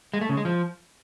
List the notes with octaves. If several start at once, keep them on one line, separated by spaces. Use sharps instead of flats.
G#3
A3
C#3
G#3
F3